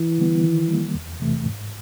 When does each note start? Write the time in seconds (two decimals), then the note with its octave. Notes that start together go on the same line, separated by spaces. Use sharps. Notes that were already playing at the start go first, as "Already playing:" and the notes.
Already playing: E3
0.18 D3 G3 B3
0.43 D#3
0.68 G3 A#3
0.95 E2
1.20 C3 E3 A3
1.45 G#2